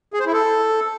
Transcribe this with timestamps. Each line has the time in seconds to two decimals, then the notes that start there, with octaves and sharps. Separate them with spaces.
0.14 G#4
0.20 C5
0.26 E4
0.32 A4